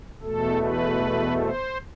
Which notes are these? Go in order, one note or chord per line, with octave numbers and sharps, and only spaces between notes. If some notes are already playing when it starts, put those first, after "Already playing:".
E2 B2 A3 A4
B4
C5